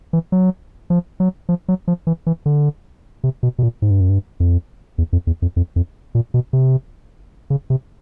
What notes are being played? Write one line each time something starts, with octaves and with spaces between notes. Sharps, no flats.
E3
F#3
F3
F#3
F3
F#3
F3
E3
E3
D3
C3
B2
B2
A#2
G#2
G2
F#2
G2
F2
E2
F2
E2
F2
F2
F2
A#2
B2
C3
C#3
C3